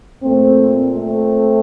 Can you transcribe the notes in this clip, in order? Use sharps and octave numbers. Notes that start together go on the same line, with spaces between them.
A#2 A3 C4
A3 C4